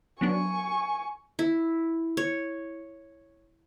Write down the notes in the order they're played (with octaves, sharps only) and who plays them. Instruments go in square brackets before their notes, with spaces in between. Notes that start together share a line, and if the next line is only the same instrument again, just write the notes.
[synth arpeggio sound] F#3 B3 D4 [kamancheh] G#5 C#6
[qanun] E4
C#5